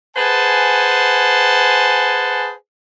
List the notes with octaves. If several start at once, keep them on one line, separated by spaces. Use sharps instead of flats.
G#4 B4 C5 F#5 G#5 A5